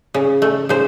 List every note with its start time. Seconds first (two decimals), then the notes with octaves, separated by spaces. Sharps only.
0.14 C#3
0.42 A3
0.69 C#3 C5